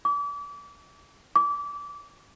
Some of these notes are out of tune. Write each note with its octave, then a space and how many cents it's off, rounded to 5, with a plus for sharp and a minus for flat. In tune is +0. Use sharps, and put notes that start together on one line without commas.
D6 -35
D6 -25